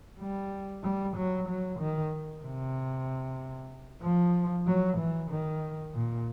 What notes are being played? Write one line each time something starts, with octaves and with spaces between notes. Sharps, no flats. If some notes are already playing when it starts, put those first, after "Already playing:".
G3
G3
F#3
F#3
D#3
C3
F3
F#3
E3
D#3
A#2